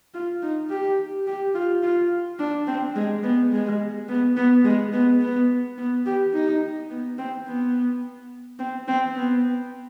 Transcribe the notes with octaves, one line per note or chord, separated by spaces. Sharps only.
F4
D#4
G4
G4
F4
F4
D4
C4
G#3
B3
G#3
B3
B3
G#3
B3
B3
B3
G4
D#4
B3
C4
B3
C4
C4
B3